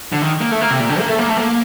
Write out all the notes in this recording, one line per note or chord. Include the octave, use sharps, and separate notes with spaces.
D3
D#3
A#3
A3
A#3
C3
A#2
D3
A#3
A3
A#3
A3
A#3